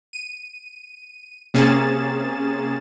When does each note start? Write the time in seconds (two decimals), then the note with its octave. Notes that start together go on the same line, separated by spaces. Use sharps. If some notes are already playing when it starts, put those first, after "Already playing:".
0.13 D#7
1.54 C3 A#3 C#4 G#4 A6 E7